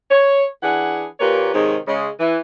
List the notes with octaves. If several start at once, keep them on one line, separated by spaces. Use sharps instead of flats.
C#5
E3 D4 G#4 F#5
A#2 A#3 G4 B4 C#5
G#2 C3 D#3 G#4 C#5
C#3 G#3
E3